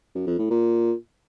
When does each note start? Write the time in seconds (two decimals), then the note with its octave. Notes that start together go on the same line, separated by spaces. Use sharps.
0.15 F#2
0.27 F2
0.38 A2
0.50 A#2